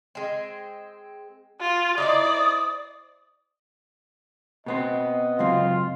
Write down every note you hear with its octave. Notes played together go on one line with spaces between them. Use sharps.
G#3 C4
F4
D#4 E4 C5 D5 D#6
B2 B3 C4 D#5
C#2 F#2 C4 F4